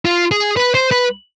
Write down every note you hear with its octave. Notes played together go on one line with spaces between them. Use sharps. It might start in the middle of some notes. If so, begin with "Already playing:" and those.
F4
G#4
B4
C5
B4